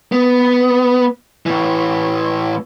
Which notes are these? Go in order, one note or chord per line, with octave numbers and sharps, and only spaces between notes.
B3
A2 E3